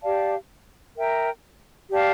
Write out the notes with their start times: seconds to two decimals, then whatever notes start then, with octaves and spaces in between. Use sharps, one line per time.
0.02 G4 D5 F5 A5
0.97 A#4 E5 G5 A#5
1.90 G4 D5 F5 A5